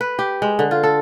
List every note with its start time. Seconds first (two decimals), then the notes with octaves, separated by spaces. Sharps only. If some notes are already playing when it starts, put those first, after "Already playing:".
0.01 B4
0.19 G4
0.42 G#3
0.59 D3
0.71 F4
0.83 A4